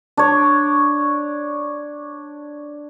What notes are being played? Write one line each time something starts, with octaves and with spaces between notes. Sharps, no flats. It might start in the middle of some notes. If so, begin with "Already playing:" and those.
D4 C#5